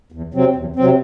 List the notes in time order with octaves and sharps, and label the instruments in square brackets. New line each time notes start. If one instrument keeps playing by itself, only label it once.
[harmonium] E2
C3 F#3 C4
E2
C3 F#3 C4